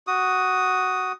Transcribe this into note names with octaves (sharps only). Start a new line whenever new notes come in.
F#4 D#6